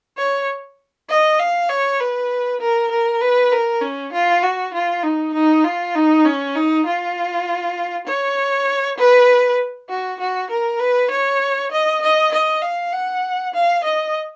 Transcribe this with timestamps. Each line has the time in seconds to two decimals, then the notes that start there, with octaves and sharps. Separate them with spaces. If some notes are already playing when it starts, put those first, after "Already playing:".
0.17 C#5
1.09 D#5
1.39 F5
1.69 C#5
2.00 B4
2.61 A#4
2.91 A#4
3.21 B4
3.52 A#4
3.81 C#4
4.13 F4
4.43 F#4
4.74 F4
5.03 D#4
5.34 D#4
5.64 F4
5.95 D#4
6.25 C#4
6.55 D#4
6.86 F4
8.07 C#5
8.98 B4
9.89 F#4
10.20 F#4
10.50 A#4
10.80 B4
11.11 C#5
11.72 D#5
12.02 D#5
12.32 D#5
12.62 F5
12.93 F#5
13.54 F5
13.84 D#5